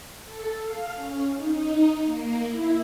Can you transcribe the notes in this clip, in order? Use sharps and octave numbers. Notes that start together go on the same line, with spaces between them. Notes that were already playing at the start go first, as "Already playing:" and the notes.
A4
F5
C#4
D#4
A#3
E4